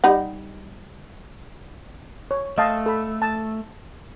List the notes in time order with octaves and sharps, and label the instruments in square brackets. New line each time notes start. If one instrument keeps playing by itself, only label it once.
[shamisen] G3 D#4 F#5
[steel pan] C#5
[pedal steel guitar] A3 [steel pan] D#5 F5 A5
[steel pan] A4 B5
A5